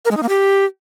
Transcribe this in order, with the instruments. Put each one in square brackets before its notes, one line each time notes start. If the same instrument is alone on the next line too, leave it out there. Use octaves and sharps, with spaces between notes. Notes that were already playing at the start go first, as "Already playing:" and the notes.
[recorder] A#4
G#3
D#4
A#3
G4